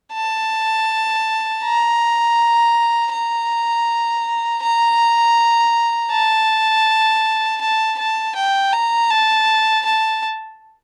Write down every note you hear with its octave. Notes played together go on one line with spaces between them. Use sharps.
A5
A#5
A#5
A#5
A5
A5
A5
G5
A#5
A5
A5